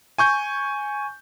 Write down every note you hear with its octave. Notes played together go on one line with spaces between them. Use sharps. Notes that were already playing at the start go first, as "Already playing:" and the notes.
G#5 C#6 G6